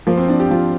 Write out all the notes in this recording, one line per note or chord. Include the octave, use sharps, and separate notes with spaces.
F3 A#3
C4
C4 D4
G4
F3 F4